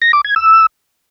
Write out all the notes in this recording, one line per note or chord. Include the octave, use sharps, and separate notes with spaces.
A#6
D6
G#6
E6